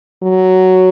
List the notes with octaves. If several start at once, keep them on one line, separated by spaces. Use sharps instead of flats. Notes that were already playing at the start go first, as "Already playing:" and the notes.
F#3